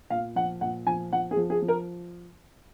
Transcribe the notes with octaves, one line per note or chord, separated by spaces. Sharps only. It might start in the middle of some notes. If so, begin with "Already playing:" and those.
A#2 F5
F3 F#5
A#2 F#5
F3 G#5
F3 F#5
G#4
F3
G#4
F3
A#4